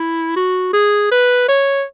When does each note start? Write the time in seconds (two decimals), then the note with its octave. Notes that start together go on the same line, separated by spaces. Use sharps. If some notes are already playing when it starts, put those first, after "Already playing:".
Already playing: E4
0.36 F#4
0.73 G#4
1.11 B4
1.48 C#5